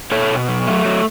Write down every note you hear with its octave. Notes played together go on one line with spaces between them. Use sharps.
B2 A4 C#5
B2
F#3
A3
F#3